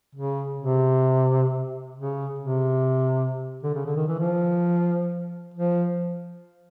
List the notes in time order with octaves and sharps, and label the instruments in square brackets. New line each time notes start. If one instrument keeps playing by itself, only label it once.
[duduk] C#3
C3
C#3
C3
D3
C#3
D3
D#3
E3
F3
F3